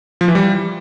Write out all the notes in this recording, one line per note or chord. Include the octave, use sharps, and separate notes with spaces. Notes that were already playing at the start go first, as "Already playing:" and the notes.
F3
E3
G3